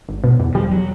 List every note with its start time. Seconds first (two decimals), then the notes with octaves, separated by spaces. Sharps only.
0.09 G#1
0.24 B2
0.40 E2
0.55 F3 G3
0.72 F#3